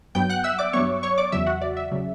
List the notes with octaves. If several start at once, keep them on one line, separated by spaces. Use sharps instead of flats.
G2 F#3 B3 G5 G6
F#5 F#6
E5 E6
D5 D6
G2 F#3 B3 C#5 C#6
C#5 C#6
D5 D6
E2 C#3 F#3 E5
F#4 F#5
D5
E5
C#3 F#3